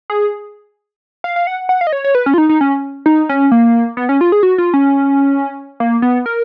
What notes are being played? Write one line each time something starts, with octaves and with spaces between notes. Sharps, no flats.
G#4
F5
F5
F#5
F#5
F5
D#5
C#5
C#5
B4
C#4
F4
D#4
D#4
C#4
D#4
C#4
A#3
B3
C#4
F4
G#4
F#4
F4
C#4
A#3
B3
A#4